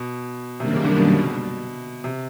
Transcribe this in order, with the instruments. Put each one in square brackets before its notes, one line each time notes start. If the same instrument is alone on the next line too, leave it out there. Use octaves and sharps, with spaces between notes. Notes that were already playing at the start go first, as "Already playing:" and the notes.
Already playing: [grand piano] B2
[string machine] F#2 D#3 G3 A#3 D4 [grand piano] C3
[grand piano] C#3
D3
B2
C3